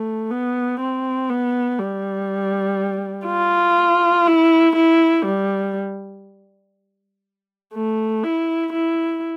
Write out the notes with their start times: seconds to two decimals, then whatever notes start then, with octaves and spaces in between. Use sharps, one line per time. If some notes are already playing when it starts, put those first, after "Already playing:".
Already playing: A3
0.31 B3
0.80 C4
1.29 B3
1.79 G3
3.27 F4
4.27 E4
4.76 E4
5.26 G3
7.74 A3
8.24 E4
8.73 E4